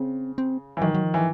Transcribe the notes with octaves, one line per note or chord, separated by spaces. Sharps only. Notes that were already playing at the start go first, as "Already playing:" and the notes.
Already playing: C#3 C4
C4
E3
D#3 F#3
F#3
F3
E3